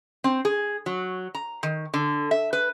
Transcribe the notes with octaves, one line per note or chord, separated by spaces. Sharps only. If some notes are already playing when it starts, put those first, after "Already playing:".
C4
G#4
F#3
A#5
D#3
D3
E5
B4